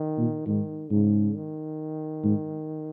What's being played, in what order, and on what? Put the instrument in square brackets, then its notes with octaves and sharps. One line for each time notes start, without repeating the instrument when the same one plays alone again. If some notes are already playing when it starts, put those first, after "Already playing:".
Already playing: [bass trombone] D#3
[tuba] A#2
[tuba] G#2 [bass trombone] D#3
[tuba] G#2 [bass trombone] C#3
[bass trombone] D#3
[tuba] G#2